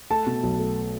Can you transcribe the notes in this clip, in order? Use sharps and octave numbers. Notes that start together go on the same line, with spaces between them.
A3 A5
B2
B1
A3